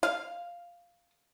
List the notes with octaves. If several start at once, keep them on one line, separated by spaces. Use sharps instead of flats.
F5